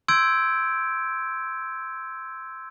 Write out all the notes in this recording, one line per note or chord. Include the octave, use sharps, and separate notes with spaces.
C6 E6 G6 G#6 D7